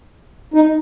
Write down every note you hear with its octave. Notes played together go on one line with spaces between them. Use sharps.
D#4